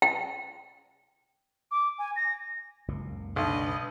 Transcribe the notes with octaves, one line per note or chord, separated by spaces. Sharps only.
G5
D6
G#5
A#6
F#1 C#2 A#2
B1 D4 B4 D#5